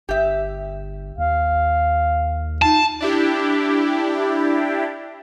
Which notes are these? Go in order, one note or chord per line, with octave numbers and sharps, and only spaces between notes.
G1 G4 E5
D#2 F5
D#4 F4 A5
D4 E4 G4